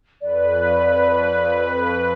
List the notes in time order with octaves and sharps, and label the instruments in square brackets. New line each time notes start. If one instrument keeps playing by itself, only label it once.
[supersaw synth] F2 B4 [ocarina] D5